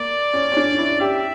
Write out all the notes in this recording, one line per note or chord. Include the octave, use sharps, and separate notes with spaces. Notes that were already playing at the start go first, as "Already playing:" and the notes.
Already playing: A#3 D5
C#4
C#4
D4
E4
G4 E5